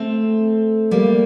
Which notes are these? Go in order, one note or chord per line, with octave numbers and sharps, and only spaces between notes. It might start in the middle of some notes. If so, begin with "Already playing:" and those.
Already playing: A3 C4
G3 A#3